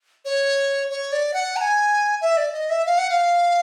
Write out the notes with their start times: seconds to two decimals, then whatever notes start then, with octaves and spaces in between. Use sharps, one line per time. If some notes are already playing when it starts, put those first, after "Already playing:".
0.25 C#5
0.90 C#5
1.12 D5
1.34 F#5
1.56 A#5
1.61 G#5
2.21 E5
2.37 D5
2.53 D#5
2.70 E5
2.86 F5
2.98 F#5
3.09 F5